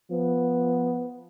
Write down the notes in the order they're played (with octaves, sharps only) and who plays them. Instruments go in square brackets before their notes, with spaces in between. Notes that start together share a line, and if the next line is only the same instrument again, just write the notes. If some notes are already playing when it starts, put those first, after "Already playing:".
[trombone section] F3 B3